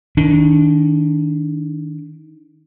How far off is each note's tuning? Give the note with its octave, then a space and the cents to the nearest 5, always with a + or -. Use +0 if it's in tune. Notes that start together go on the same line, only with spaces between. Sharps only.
D#3 +15 D4 -20